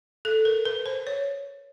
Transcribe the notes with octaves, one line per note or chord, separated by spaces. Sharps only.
A4
A#4
B4
C5
C#5